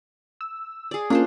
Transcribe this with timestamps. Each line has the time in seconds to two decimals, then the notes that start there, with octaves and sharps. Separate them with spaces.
0.41 E6
0.91 G#4 D5
1.10 A#3 C#4 D4 F4 C5